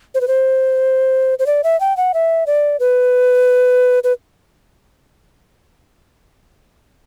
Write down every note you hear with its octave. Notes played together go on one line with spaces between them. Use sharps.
C5
B4
C5
C5
D5
E5
G5
F#5
E5
D5
B4
B4